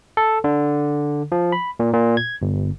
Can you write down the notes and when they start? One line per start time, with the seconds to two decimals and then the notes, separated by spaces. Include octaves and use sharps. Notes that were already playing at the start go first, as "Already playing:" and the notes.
0.17 A4
0.44 D3
1.32 F3
1.52 B5
1.80 A#2
1.93 A#2
2.17 G#6
2.42 G1